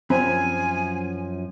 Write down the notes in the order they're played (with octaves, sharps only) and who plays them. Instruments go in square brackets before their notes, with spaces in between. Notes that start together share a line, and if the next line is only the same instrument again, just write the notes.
[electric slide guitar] F#2 F3 [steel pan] C4 [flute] G#5